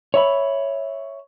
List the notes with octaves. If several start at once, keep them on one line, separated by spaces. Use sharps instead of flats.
C#5 E5 B5